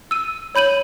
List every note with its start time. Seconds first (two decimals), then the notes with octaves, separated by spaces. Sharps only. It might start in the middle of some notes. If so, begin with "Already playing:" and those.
0.11 E6 D#7
0.55 C#5 B5 G6 D#7 F#7